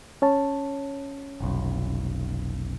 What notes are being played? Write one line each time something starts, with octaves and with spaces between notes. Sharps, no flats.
C#4 C#5 A5
F1 B1